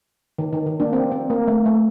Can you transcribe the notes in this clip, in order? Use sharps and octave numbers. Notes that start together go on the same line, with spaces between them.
D#3
D#3
D#3
A#3 D4
C4
C4
A#3
A3
A3